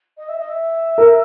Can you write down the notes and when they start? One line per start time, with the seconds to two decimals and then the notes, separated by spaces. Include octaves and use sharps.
0.17 D#5
0.28 E5
0.38 D#5
0.49 E5
0.98 A#4